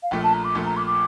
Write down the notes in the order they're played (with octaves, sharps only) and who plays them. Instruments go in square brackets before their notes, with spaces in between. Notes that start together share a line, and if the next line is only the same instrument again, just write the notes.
[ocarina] F5
[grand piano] A#1 A#2 A3 [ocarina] G5
[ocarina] A5
A#5
D6
[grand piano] A#1 A#2 A3
[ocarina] A#5
D6
D6